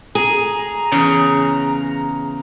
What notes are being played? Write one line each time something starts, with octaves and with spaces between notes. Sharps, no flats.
G#4 A#5
E2 C#3